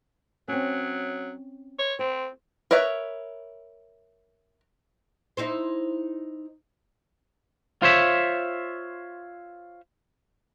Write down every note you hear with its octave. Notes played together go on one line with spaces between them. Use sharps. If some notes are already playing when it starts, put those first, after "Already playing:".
F#3 C4 C#4
C#5
C4 C5
A#4 B4 C#5 E5
D#4 E4 C5
F4 C5 C#5 E5